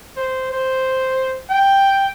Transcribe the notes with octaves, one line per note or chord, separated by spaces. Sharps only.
C5
C5
G5